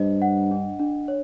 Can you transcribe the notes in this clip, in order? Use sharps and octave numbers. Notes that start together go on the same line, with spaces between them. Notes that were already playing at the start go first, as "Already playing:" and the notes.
Already playing: G2 C5 D#5
F#5
D4
D4
C#5